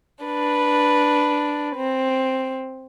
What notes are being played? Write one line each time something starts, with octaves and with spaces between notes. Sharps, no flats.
D4 B4
C4